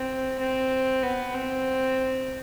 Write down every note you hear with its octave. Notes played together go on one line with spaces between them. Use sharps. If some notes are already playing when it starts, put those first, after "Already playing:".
Already playing: C4
C4
B3
C4